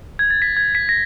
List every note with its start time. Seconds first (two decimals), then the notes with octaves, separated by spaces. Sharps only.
0.19 G#6
0.30 A6
0.42 B6
0.56 G#6
0.75 B6
0.89 A#6